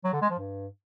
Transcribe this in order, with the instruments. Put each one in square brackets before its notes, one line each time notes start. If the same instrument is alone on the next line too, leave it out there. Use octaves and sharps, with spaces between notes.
[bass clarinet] F#3
D3
G#3
F3
G2